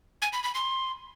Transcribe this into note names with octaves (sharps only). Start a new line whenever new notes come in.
G#5
B5
B5
C6